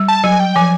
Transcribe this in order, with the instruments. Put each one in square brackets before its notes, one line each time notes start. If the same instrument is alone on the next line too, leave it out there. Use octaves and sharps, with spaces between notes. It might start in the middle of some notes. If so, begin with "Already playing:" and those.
Already playing: [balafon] G3
[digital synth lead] A5
[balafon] F#3 [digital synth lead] G#5
[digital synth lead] G5
[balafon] F3 [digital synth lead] G#5